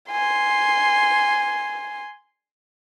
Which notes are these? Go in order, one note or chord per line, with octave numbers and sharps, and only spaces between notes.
G#5 C6